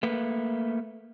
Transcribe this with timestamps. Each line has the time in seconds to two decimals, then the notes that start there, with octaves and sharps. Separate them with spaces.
0.03 A3 A#3 B4